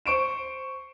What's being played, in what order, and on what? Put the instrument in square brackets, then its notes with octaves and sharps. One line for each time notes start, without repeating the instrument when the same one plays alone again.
[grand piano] C5 C#6 D7 E7